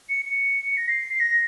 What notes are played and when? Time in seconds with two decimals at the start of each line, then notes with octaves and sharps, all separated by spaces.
0.09 C#7
0.25 C#7
0.77 A#6
0.88 C7
1.14 C7
1.20 A#6